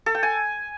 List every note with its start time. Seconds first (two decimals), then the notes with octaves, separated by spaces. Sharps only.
0.06 A4
0.15 G5
0.23 G#5